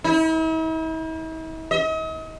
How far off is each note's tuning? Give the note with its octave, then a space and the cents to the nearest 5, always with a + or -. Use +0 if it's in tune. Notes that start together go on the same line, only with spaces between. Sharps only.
E4 -45
D#5 +40